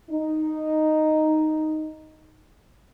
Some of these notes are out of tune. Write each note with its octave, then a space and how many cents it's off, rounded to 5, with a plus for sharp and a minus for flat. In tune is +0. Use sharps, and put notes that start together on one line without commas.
D#4 -5